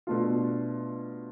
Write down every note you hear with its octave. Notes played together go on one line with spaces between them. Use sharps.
B2 A3 D4 F4